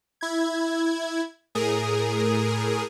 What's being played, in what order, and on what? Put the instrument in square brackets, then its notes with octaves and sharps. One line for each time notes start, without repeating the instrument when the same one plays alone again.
[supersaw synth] E4 G#6
A2 G#4 A#4 D#6